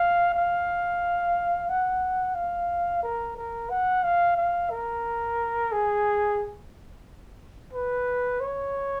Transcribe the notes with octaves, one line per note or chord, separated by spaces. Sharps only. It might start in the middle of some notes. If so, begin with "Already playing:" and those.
Already playing: F5
F5
F#5
F5
A#4
A#4
F#5
F5
F5
A#4
G#4
B4
C#5